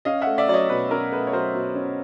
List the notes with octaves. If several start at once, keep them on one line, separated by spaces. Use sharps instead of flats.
C#4 D#5 F5
E5 F#5
A3
D5 E5
F#3 D5
C#5 D#5
B2 B4
C#4 A#4
A3 B4
C#5
F#3 A#4 C5
B2
C#4